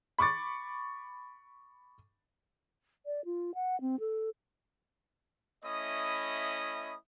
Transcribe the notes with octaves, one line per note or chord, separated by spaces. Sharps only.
B5 C#6 D6 A6
D5
F4
F#5
C4
A4
A3 C#4 E4 D#5 B5 D#6